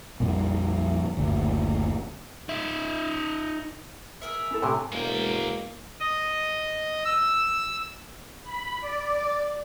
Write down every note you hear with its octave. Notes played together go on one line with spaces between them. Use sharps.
A#1 F2 A#2 G3
F#1 D2 A#2
D#4 E5
G#4 A#4 E5
C#4 E4 A4
A2 C3 D4 A#4 G#5
E1 G#3 A#3 G5
D#5
E6
B5
D5